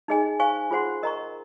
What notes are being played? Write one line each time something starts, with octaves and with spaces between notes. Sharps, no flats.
D#4 G#4 D#5 G#5
C5 F5 G#5 C#6
F4 G#4 C5 F#5 C6
A#4 D#5 A#5 C#6